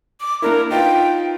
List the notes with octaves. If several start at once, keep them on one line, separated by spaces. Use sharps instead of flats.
D6
A#3 D4 E4 A#4
D#4 F4 B4 G5